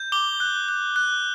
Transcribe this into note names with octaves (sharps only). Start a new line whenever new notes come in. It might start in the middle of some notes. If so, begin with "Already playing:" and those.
Already playing: G6
D6 G7
F#6
F#6
F#6